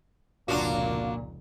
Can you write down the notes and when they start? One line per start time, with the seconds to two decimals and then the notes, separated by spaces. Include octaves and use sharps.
0.48 F1 C#2 A#2 A#3 D4 F4 F#4